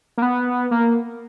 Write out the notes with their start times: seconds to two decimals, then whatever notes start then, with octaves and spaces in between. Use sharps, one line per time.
0.18 A#3
0.22 B3
0.71 A#3